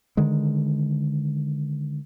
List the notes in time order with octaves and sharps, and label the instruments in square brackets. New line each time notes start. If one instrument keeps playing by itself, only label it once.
[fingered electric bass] D3 D#3 G#3